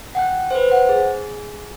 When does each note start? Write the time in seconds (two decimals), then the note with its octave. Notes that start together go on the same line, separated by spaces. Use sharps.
0.15 F#5 G5 F#6
0.51 B4 C5
0.70 C5 F#5
0.89 G#4